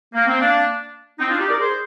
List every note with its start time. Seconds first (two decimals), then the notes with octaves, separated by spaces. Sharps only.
0.14 A#3
0.26 C4
0.40 A#3 D4
1.19 C4 D#4
1.29 D4 F4
1.39 D#4 G4
1.49 A#4 D5
1.59 G#4 C5